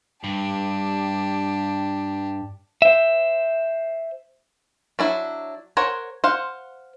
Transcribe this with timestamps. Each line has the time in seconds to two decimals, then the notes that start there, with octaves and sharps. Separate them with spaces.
0.24 G2 D4 G4
2.82 C5 E5
4.99 F#3 D4 E4
5.77 A#4 C5 C#5 F#5
6.24 C5 F5 F#5